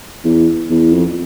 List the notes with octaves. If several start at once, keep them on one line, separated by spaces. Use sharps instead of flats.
E2
E2
F2